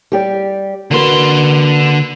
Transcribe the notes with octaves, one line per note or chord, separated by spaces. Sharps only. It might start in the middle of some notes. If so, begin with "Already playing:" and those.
G3 G4 D5
D3 A#3 F#4 B4 C6